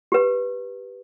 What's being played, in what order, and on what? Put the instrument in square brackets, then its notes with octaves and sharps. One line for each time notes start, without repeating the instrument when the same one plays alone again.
[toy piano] G4 B4